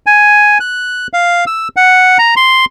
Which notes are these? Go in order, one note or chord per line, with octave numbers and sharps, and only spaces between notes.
G#5
F#6
F5
E6
F#5
A#5
C6